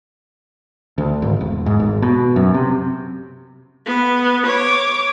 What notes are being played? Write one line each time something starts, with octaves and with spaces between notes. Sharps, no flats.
D2
G#1
E1
G#2
G#1
B2
F#2
C3
B3
C#5 D6